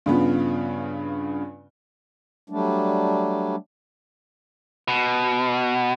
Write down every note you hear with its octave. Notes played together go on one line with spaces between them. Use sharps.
G2 C#3 B3 F4
F#3 G3 A3 D4
B2